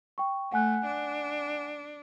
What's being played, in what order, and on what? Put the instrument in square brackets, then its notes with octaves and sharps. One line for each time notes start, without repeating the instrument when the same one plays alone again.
[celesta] G5 C#6
[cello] A3 [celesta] F#5 G#5 F#6
[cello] D4